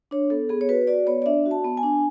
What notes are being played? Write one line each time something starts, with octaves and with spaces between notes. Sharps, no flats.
D4 C#5
B3 A4
B3 G#4
C#5
F#4 B4
F#4 D5
B3 C#5
D5
D4 E5
F#4
A5
B3
G#5
D4